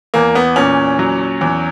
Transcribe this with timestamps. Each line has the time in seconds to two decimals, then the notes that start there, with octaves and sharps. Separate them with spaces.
0.14 E2 A#3
0.35 B3
0.56 A#2 C#4
0.99 F#3
1.41 E2